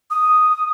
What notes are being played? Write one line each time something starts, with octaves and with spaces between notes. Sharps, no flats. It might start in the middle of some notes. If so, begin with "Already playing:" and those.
D#6